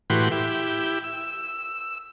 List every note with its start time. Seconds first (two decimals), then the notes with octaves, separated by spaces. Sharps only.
0.10 A2 E3 F#4 G4 B4 C6
0.31 E4 G4
1.04 E6